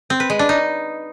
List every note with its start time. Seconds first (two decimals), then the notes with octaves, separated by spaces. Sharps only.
0.10 C4
0.20 B4
0.30 G#3
0.39 D4
0.49 D#4